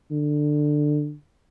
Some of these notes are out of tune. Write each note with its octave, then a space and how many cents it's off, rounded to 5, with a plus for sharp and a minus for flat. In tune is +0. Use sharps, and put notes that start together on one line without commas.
D3 +15